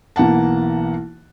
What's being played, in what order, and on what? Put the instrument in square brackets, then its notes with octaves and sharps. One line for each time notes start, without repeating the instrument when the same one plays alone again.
[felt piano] B1 E3 A#3 F#5 A5